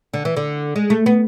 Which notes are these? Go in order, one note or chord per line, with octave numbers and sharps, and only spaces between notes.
D3
E3
D3
G#3
A3
B3